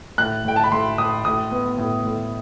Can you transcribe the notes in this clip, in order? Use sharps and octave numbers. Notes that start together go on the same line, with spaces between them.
A2 F#6
A2 G5
A5
B5
A2 C6
A2 D#6
A2 D#6
B3
A2
A2